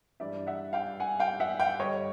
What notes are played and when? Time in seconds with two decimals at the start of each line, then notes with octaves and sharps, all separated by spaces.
0.20 G2 E3 G3 D5 E5
0.47 E5 F#5
0.73 F5 G5
1.00 F#5 G#5
1.19 F5 G5
1.40 E5 F#5
1.60 F5 G5
1.79 G2 D3 G3 C#5 D#5